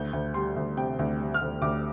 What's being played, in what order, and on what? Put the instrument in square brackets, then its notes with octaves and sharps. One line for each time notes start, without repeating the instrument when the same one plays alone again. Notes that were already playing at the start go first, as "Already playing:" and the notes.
Already playing: [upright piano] D2 G6
D2
G3 C6
D2
C3 G5
D2
G3
F6
D2
D2 D6